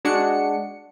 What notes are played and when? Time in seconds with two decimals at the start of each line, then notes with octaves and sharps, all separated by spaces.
0.05 G#3 D4 F#4 C#7